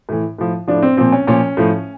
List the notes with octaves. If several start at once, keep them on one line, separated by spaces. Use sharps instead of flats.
A2 E3
A2 F3
A2 F3 D4
C4
A#2 F3 C4
C#4
A#2 F3 C#4
A2 F3